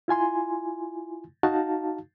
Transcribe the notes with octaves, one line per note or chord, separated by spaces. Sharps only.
E4 F4 G#5 C6
D#4 F#4 F5 A5